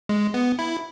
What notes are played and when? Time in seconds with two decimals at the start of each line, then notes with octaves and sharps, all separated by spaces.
0.09 G#3
0.34 B3
0.59 E4